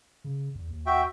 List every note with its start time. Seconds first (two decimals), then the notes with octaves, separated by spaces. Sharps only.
0.24 C#3
0.55 E2
0.70 D#2
0.86 F#4 E5 G5